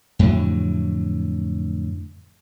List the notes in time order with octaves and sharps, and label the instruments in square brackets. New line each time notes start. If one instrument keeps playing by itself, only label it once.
[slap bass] F2 A2 D3 F#3